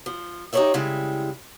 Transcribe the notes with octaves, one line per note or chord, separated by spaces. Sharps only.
F3
D#4 G4 B4 C#5 D5 E5
C#3 G3 G#3 E4